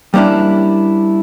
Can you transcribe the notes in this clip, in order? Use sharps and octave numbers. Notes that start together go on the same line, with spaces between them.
G3 A#3 C#4 D4 E4